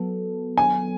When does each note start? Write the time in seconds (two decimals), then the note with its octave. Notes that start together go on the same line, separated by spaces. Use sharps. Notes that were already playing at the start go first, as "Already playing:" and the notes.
Already playing: F#3 B3 A4
0.58 G#5